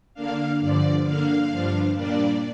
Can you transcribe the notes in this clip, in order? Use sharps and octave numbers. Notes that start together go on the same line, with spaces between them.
D3 A#3 D4 F5
G2 D3 F3 D5
D3 A#3 D4 F5
G2 F3 D4
A#2 G3 A#3 D4 D5